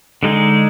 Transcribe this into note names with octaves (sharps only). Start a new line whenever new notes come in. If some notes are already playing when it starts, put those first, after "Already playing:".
D3 G#3 D#4 G#4